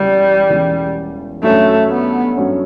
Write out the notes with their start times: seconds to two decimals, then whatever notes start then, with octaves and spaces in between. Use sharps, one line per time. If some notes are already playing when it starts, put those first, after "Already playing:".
Already playing: E1 E2 C#3 E3 G3
0.49 E1 E2 C#3 E3
1.43 G2 F#3 A3 C#4
1.90 B3
2.37 G2 F#3 C#4